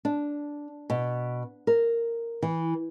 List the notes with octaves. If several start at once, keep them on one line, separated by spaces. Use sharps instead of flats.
D4
B2
A#4
E3